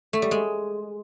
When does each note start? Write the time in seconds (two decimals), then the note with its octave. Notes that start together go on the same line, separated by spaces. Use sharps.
0.13 A3
0.22 G3
0.31 G#3